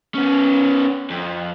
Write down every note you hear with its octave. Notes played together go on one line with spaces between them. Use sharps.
B3 C#4
F2